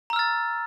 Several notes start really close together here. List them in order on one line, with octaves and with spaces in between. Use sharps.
A#5 E6 F6 A6